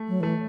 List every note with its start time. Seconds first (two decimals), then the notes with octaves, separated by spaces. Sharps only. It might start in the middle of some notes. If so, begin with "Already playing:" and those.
Already playing: A3
0.08 F#3
0.20 E3 A3